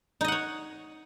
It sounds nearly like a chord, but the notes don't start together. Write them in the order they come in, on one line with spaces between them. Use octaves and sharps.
D#4 D#5 F#5 C#5